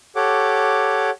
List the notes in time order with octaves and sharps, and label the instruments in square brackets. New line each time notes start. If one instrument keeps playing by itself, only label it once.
[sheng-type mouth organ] G4 A4 C#5 F#5 D6